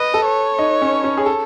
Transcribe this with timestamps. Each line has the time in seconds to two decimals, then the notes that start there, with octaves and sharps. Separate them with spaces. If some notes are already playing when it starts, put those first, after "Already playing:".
Already playing: B4 D#5
0.14 A4
0.26 C#5
0.59 D#4
0.82 C#4
1.04 C#4
1.17 G#4
1.26 A4